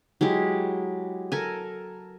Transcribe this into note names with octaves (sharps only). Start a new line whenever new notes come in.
F#3 G#3 E4 G4
A4 A#4 G#5